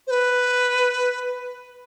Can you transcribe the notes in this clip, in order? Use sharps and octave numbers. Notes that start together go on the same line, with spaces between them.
C5
B4